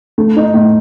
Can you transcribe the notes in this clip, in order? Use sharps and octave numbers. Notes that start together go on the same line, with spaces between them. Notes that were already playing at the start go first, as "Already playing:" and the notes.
A3
D#4
A2